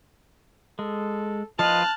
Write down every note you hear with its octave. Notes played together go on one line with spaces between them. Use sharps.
G#3 A4
F3 F4 B4 D#5 A5 F6 F#6